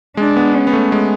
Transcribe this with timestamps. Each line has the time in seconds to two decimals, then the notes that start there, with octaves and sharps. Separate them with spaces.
0.17 G#3 D4
0.36 B3
0.55 C#4
0.67 B3
0.73 A3
0.92 G#3